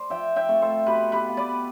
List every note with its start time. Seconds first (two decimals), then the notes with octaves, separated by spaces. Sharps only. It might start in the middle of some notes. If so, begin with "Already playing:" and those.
Already playing: C5 D5
0.10 F3 E5 G5
0.36 E5 G5
0.48 A3 C4 F4
0.62 A4 C5
0.86 B2 G4 B4
1.12 G4 B4
1.25 B3 F4
1.37 B4 D5